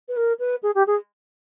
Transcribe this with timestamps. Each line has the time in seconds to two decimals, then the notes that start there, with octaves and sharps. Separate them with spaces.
0.08 B4
0.17 A#4
0.39 B4
0.63 G#4
0.75 G4
0.87 G#4